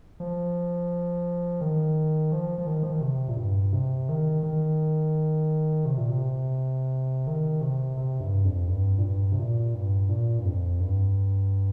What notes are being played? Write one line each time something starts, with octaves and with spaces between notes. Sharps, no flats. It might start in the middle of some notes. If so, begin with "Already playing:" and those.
F3
D#3
F3
F3
D#3
F3
D#3
C3
A#2
G2
C3
D#3
D#3
C3
A#2
C3
D#3
C3
C3
G2
F2
G2
A#2
G2
C3
A#2
G2
A#2
G2
F2
G2